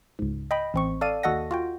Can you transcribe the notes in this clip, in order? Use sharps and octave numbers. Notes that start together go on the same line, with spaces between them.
C#2 G#2
D#5 G5 B5
A1 C4 C#6
A4 D5 F5 D#7
D#2 F#4 A4 D#5 F#5 A#6
F4 F#4 G5